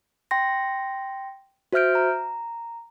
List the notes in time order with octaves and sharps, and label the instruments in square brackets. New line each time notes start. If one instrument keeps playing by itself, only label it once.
[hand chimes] G5 C6 A#6
F#4 C5 E5 F6 G6 D7
A#5